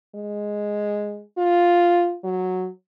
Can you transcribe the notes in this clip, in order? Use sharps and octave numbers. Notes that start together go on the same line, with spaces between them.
G#3
F4
F#3